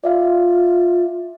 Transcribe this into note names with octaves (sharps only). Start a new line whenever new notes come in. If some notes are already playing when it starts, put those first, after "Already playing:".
F4 D5 E5 F5